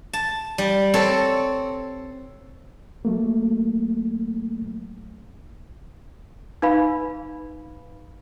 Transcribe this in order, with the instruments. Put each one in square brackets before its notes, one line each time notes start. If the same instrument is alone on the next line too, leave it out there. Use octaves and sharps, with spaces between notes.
[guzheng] A5
G3
C4 A4 C#5
[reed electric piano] F#3 A3 A#3
[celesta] D#4 B4 F5 B5